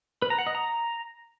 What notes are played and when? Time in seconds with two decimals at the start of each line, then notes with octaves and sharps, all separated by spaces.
0.22 B4
0.30 A#5
0.38 F#5
0.47 D#5
0.55 A#5